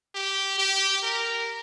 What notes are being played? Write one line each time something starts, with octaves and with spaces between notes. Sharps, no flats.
G4
G4
A#4